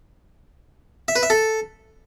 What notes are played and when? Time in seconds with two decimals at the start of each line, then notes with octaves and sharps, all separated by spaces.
1.08 E5
1.16 B4
1.23 E5
1.30 A4